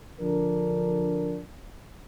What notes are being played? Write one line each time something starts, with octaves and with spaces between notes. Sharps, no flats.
D3 F3 D4 A#4